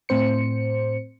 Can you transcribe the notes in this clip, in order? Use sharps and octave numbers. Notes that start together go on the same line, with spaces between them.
A2 C4 C5 C#7